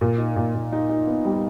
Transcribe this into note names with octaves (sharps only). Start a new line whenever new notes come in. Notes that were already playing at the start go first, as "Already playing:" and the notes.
A#2
D#4
A#2
A#2
D#4
D#4
B3
G3